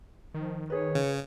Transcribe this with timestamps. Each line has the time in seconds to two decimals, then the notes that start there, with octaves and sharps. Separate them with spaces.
0.34 D#3 F3
0.70 G#4 B4 C#5
0.95 C#3